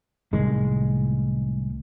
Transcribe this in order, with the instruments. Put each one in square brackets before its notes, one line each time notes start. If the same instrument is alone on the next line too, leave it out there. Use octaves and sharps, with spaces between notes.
[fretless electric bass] C2 A2 D#3 G#3